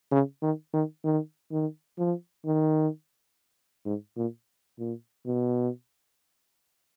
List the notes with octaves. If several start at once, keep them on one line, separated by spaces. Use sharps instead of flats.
C#3
D#3
D#3
D#3
D#3
F3
D#3
G#2
A#2
A#2
B2